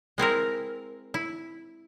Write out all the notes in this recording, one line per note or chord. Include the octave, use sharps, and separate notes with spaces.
G#3 C4 E4 A#4
E4